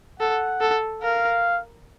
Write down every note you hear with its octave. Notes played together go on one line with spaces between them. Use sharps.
A4 F#5
A4
A#4 F5